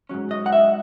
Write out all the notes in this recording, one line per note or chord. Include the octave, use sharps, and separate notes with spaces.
G#2 F#3 C#4
D#5
F#5
E5